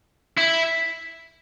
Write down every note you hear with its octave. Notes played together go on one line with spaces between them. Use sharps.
E4